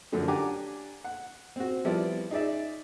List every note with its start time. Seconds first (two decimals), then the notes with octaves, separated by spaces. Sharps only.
0.12 F#2 D3 F3 F#3 A3 D4
0.28 D4 G4 F#5 G#5 A#5 D6
1.04 F#5
1.56 C4 F#4
1.85 F3 G3 B3 E4 D5
2.31 D#4 G#4 D5 E5